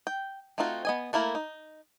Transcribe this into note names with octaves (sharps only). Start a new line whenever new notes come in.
G5
A3 C4 D#4 F4 F#4
B3 D#5 G#5
A3 A#3 E4 A#4
D#4